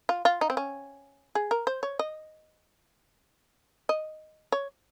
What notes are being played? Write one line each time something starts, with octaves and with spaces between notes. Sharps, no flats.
F4
F4
D#4
C4
C#4
G#4
A#4
C5
C#5
D#5
D#5
C#5